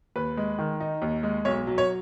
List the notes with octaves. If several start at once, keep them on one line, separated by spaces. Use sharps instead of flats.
D#2 B4
G#3
D#3
D#4
D#2
G#3
B1 C#5
F#3
C#5